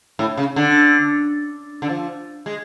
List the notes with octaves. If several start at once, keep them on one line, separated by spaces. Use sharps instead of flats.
A2
C#3
D3
D3
F3
G#3